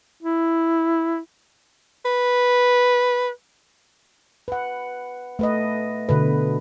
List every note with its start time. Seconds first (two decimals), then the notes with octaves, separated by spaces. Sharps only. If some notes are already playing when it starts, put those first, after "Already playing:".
0.23 E4
2.05 B4
4.48 B4 F#5
5.39 A3 B4 D#5
6.09 B2 D3 B4